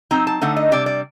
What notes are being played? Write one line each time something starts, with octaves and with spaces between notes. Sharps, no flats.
F#3 C4 D#4 A#5
A5
D3 A3 D#4 F#5
D#5
C3 G3 D4 D5
D5